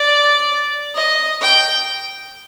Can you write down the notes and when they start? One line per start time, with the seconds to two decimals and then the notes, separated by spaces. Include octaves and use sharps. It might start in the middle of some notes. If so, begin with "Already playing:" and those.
Already playing: D5
0.95 D#5
1.41 G5